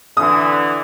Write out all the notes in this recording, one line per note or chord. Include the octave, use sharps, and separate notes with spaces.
D3 E3 D#6